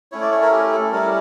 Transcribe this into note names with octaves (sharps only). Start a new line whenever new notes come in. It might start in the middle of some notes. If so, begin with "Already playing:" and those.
A3 C#4 E4 C#5
D5
C#5
A#4
G4
A4
G3 C#4 E4 A#4